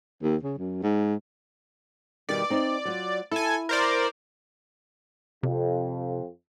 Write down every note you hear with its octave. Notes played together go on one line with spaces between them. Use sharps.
D#2
C#3
F#2
G#2
B2 D#3 G3 D5
C4 D#4
F#3 F4
E4 A4 G#5
A#4 C5 D5
F2 C3